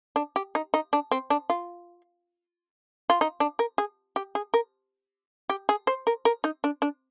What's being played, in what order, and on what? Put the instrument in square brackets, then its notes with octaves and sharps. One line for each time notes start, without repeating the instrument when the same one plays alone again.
[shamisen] D4
G4
D#4
D#4
D4
C4
D4
F4
F4
D#4
D4
A#4
G#4
G4
G#4
A#4
G4
G#4
C5
A#4
A#4
D#4
D4
D4